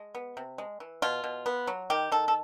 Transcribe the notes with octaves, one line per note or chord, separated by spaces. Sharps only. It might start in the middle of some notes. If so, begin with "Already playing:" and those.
Already playing: G#3
B3
C3
G#3
E3
B2 F4
B2
B3
F#3
D#3 G4
D#3 A4
A4